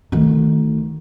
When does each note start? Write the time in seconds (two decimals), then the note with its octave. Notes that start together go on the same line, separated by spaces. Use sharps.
0.12 D2 D#3